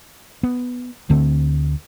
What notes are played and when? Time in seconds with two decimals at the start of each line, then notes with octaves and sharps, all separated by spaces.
0.43 B3
1.10 D2 D3 A3 C4